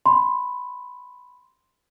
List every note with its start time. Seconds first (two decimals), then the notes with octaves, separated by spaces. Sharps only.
0.06 B5 C6